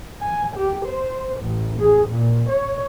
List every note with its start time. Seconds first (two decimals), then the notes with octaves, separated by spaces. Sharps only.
0.22 G#5
0.56 G4
0.86 C5
1.41 A1
1.80 G#4
2.09 A#2
2.50 C#5